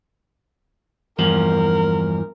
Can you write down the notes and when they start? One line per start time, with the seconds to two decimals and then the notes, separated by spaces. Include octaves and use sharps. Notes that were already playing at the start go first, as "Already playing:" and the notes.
1.19 E2 G2 F3 A#4